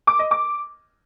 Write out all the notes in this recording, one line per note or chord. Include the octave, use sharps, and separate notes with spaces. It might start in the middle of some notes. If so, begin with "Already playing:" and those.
D6
D#5
D6